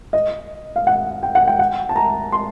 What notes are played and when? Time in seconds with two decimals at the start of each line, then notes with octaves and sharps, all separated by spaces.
0.13 D#5
0.76 F5
0.87 F#5
1.23 G5
1.35 F#5
1.48 G5
1.59 F#5
1.89 A5
1.96 A#5
2.32 C6